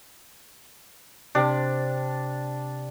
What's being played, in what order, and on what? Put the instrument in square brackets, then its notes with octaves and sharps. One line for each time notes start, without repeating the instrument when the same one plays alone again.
[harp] C3 [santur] D4